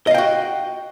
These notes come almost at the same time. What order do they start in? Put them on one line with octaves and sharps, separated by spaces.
D#5 F5 G5 F#4